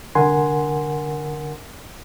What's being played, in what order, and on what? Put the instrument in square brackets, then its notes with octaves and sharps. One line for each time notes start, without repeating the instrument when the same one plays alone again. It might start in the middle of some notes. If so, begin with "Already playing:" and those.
[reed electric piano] C2 D3 A#4 F#5 G#5 C6